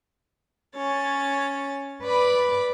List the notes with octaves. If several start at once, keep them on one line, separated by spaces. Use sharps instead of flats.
C#4 C#5 A6
B4 D5 B5 D6